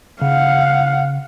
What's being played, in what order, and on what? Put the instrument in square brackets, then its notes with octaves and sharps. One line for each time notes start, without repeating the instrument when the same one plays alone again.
[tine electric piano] C#3 [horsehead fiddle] F5 F#5